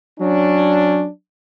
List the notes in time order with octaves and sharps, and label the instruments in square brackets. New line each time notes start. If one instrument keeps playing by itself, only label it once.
[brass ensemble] F#3 C#4 D4